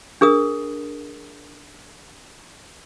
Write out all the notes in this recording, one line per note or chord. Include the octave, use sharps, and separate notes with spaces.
D4 G#4 A#4 D#6